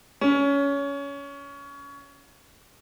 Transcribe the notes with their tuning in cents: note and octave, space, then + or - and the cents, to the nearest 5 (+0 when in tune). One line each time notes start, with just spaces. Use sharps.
C#4 +20